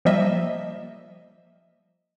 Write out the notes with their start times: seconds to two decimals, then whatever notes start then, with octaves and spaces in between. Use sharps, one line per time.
0.05 F3 G3 A#3 D#5 E5